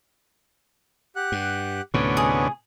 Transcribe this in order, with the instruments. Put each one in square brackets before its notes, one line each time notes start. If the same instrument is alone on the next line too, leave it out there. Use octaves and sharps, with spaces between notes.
[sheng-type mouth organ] G4 F#5 F#6
[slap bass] G2
[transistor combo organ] D2 B3 C#4 [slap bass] A2 C3
[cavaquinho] G#4 D#6 [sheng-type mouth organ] D#5